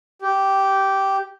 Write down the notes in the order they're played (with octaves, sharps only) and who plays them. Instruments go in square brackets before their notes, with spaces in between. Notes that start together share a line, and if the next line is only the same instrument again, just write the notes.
[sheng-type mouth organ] G4